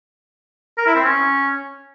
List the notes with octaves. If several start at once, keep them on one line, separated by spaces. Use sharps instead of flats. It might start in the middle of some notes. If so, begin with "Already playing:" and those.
A#4
E4
C4
C#4